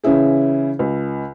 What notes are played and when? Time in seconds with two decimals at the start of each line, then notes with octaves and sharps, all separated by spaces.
0.04 C#3 E3 C#4 E4 G#4
0.79 C#2